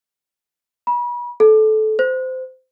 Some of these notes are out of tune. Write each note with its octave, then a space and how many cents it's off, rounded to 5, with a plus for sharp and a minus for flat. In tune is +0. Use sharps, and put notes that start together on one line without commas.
B5 -35
A4 -20
C5 -20